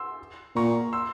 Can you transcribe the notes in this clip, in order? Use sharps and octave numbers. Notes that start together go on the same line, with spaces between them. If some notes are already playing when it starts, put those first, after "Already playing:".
Already playing: C6 E6
A#2 A#5 C#6
C6 E6